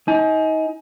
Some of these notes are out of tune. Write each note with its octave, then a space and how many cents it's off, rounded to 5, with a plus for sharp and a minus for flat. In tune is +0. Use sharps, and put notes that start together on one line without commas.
D#4 +30 G#5 +25